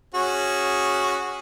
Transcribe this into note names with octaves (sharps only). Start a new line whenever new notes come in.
C#4 F#4 G#4